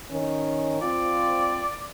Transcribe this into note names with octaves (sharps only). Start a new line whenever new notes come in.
D#3 C#4
C4 F4 D5